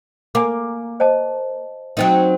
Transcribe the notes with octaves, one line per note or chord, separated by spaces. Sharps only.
A#3 G#5 A#5 D6
C5 D#5 A5
F#3 C4 D#4